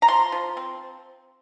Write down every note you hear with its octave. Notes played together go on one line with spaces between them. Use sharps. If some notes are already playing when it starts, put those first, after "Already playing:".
A#5
F3 C6
F3
C4